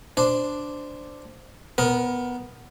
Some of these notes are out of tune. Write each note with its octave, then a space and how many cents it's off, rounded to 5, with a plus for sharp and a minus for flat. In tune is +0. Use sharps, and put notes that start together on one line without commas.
D4 +0 C5 -10
B3 +0 A#4 +20